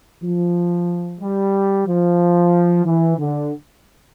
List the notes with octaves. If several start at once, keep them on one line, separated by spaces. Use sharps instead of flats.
F3
G3
F3
E3
D3